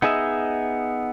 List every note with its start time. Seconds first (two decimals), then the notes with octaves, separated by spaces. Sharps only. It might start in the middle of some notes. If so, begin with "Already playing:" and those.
0.02 B3 D#4 G#4 D#5 E5